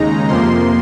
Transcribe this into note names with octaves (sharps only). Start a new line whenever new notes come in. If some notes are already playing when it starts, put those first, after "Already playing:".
Already playing: D#2 C#3 G#3 D#4 A#5
F2 C3 F3 A#3 C6